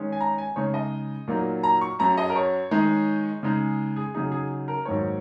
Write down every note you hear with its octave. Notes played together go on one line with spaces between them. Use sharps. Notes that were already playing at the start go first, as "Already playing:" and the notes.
Already playing: D#3 G#3 C#4
G#5
A#5
G#5
C#3 G#3 D#4 C#5
D#5
A#2 F#3 A#3 D#4
A#5
C#6
F#2 F#3 C#4 A#5
D#5
A#4
C#5
D#3 G#3 D#4
C#3 G#3 D#4
G#4
C#3 F#3 D#4 G#4
G#4
A#4
G#2 D#3 F#3 A#3 C#5